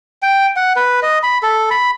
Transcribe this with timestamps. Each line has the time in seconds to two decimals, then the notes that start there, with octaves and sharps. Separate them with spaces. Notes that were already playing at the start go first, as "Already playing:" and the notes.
0.22 G5
0.56 F#5
0.76 B4
1.03 D#5
1.23 B5
1.43 A4
1.71 B5